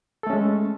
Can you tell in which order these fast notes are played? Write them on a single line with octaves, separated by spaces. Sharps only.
A4 A3 C#4 G#3